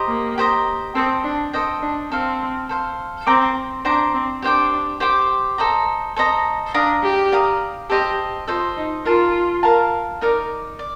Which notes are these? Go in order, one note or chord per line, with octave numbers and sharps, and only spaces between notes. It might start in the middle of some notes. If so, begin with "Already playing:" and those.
Already playing: G4 C5 D#5 A#5
A#3
G4 C5 D#5 A#5
C4 A4 C5 D#5 G5
D4
A4 C5 D#5 G5
D4
C4 A4 C5 F5
A4 C5 F5
C4 C5 G5 A#5 D6
D4 C5 G5 A#5 D6
C4
D4 G4 C5 G5 D6
G4 C5 G5 D6
A4 C5 D#5 A#5
A4 C5 D#5 A#5
D4 D5 F5 A#5 D#6
G4
D5 F5 A#5 D#6
G4 A4 C5 D#5
F4 A4 C5 D#5
D#4
F4 A#4 F5 A5
A#4 F5 A5
D#4 A#4 D5
D5